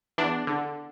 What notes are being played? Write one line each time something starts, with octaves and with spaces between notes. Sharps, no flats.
E2 D4
D3